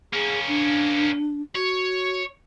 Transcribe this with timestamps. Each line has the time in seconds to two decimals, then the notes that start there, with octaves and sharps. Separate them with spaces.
0.13 A#3 C#4 G#4
0.48 D4
1.55 F#4 C#5